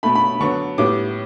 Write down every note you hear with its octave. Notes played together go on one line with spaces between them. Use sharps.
B2 A3 B5
B5
D3 F#3 B3 C#6
A2 G3 B3 D6